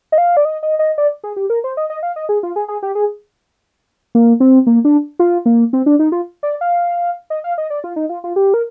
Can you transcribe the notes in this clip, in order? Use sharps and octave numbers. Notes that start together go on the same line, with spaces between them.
D#5
F5
D5
D#5
D#5
D#5
D5
G#4
G4
A#4
C5
D#5
D#5
F5
D#5
G#4
F4
G#4
G#4
G4
G#4
A#3
C4
A#3
D4
F4
A#3
C4
D4
D#4
F4
D5
F5
D#5
F5
D#5
D5
F4
D#4
F4
F4
G4
A#4